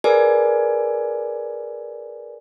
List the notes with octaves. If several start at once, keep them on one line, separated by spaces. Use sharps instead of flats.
G#4 A#4 B4 D5 G#5